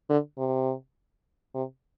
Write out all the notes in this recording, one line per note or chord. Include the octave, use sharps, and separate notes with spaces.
D3
C3
C3